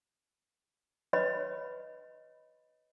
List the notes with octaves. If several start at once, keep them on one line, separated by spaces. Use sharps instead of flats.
B4 C#5 D#5 B5